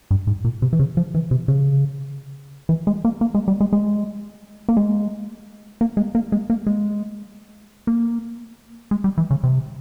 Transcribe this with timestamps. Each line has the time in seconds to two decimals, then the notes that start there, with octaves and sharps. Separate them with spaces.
0.11 G2
0.27 G#2
0.44 A#2
0.62 C3
0.73 E3
0.79 C#3
0.97 F3
1.15 E3
1.31 C3
1.48 C#3
2.69 E3
2.87 G#3
3.05 A#3
3.21 A#3
3.34 G#3
3.48 G3
3.61 G#3
3.73 G#3
4.69 A#3
4.77 G#3
5.81 A#3
5.97 G#3
6.15 A#3
6.32 G#3
6.50 A#3
6.67 G#3
7.87 A#3
8.91 G#3
9.04 G3
9.18 E3
9.30 C#3
9.43 C3